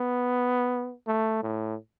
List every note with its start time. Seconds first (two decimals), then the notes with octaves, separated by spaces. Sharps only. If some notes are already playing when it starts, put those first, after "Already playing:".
Already playing: B3
1.08 A3
1.43 A2